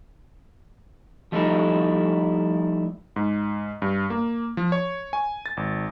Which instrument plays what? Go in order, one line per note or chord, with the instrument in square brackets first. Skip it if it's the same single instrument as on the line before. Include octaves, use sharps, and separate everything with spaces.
[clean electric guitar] F3 G3 A3 D#4 E4
[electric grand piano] G#2
G2
A#3
F3
C#5
G#5
A6
G#1